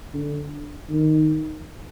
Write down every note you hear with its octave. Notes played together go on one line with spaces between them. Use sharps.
D3
D#3